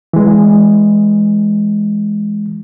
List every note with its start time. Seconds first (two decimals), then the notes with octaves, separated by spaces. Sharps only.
0.13 E3 G#3